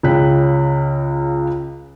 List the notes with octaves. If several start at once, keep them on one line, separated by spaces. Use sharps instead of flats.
C#2 C#3 G5 F#6 B6